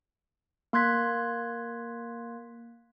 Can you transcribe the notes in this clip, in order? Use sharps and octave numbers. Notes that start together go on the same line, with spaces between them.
A#3 C6 F#6 G#6 B6